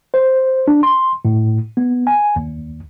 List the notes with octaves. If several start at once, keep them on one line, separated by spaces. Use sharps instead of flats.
C5
D4
C6
A2
B3
G#5
D#2